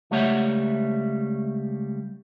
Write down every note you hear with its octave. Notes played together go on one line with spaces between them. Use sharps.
C#2 G3 A3 C#5 E5 F#5